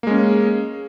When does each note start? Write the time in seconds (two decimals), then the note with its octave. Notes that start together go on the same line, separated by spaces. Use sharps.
0.03 A#3
0.07 G#3
0.11 C#4